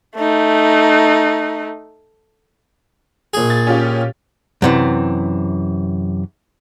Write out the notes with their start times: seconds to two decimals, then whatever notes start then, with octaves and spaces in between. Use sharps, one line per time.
0.17 A3 D#4
3.34 A#1 G#4
3.50 A6
3.67 C#4 F4 G4
4.62 F#2 C3 E3